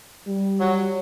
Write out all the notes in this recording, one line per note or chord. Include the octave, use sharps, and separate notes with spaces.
G3
F#3